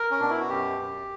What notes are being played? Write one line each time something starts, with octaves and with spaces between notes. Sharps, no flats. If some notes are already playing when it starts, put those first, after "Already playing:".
Already playing: A#4
C#4
B2 D4
E4
F#4
F#2 G4
F#2